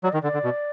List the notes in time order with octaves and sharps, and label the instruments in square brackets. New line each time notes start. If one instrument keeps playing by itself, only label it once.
[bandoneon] F#3 [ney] D5
[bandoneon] D#3 [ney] D#5
[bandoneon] D3 [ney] D5
[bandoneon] D3
B2